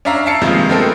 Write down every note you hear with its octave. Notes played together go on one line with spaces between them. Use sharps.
C#4 D4 E5 F5 A#5
E5 A5 C7 C#7
G2 C3 D#3 F3 G#3 A#3
G#3 A3 B3 C4 A4 A#4